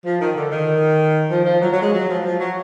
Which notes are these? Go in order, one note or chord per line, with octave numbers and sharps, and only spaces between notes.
F3
D#3
D3
D#3
F3
F3
F#3
F#3
G#3
F#3
F3
F3
F#3